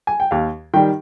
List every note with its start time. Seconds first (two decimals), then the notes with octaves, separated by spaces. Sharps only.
0.07 G#5
0.20 G5
0.31 D#2 F5
0.74 D#3 G3 G5